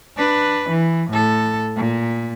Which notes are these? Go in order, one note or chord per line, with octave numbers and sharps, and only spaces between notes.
D4 B4
E3
A2 A4
A#2